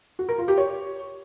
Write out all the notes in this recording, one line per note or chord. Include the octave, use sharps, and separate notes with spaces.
F#4
A#4
F4
G4
C#5